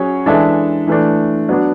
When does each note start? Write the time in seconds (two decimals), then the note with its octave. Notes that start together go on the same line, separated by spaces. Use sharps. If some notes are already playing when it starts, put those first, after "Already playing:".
Already playing: F#3 C#4 G#4 C#5
0.26 E3 G#3 D4 A4 E5
0.87 E3 A3 D4
1.49 F#3 B3 D4